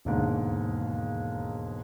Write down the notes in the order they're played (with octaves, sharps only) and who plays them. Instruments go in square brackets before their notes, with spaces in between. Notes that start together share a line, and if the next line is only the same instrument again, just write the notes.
[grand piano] E1 D#2 G#2 D3